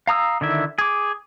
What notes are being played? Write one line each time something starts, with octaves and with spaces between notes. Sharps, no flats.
F5 A#5 D#6 E6
D3 D#3 E4 E5
G#4 D6